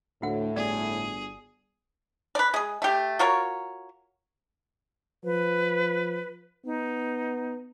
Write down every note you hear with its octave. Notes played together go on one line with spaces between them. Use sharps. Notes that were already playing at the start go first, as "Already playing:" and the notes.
D2 A2 F#4 F#5
G1 G#4 D5
B4 D5
G#3 G#4
A3 G4
F4 F#4 A#4 C#5
F3 B4
B3 D#4